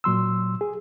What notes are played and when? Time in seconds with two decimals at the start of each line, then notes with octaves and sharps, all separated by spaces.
0.04 A#2 F#3 C6 E6
0.61 G#4